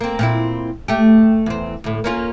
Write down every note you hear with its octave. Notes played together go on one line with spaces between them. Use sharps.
A#3 C4
A#2 C4 E4
A3 G4
E2 C4
D2 A2
A#3 C#4 F4